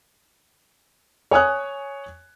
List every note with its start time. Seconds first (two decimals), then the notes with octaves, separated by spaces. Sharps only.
1.31 C#5 G#5 D#6 F#6